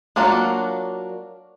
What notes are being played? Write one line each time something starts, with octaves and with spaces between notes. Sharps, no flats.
F#3 A#3 D4 F4 F#4